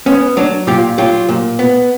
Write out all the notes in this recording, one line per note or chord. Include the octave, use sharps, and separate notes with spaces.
B3 C#4
F#3 D4
A#2 F4 G4
F#3 F4 G4
A#2
B3